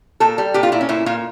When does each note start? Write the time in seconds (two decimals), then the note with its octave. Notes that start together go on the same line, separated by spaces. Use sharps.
0.20 A#2 A4
0.38 G3
0.54 A#2 G4
0.63 F4
0.72 A#2 E4
0.81 C#4
0.89 A#2 E4
1.06 A#2 F4